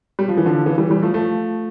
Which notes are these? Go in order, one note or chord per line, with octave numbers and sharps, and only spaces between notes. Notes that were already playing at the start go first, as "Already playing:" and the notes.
G3
F3
E3
D3 F3
C#3 E3
E3 G3
E3 G3
F3 A3
F3 A3